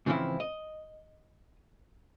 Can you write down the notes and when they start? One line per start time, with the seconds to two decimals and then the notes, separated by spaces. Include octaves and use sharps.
0.06 G#2 C#3 E3 F3 C4 E4
0.40 D#5